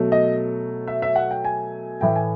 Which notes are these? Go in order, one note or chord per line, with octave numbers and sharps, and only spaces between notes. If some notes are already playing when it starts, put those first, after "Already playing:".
Already playing: B2 F#3 A3
D#5
E5
E5
F#5
G5
G#5
A2 E3 A3 G5
G#5